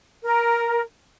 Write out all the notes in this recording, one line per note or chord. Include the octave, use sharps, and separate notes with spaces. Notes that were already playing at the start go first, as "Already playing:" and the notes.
A#4